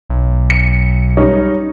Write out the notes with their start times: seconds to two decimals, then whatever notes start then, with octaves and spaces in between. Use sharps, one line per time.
0.10 B1
0.50 C#7
1.17 G3 C#4 D#4